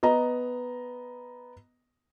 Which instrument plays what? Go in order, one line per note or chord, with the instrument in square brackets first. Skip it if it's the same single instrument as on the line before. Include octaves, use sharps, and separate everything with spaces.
[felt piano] B3 D#5 A#5